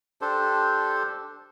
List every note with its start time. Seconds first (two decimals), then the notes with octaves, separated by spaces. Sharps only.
0.21 D4 G4 A4 C5